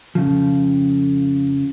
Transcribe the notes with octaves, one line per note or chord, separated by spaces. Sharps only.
F2 C#3 F3